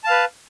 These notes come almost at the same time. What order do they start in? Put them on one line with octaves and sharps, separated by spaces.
A5 F5 B4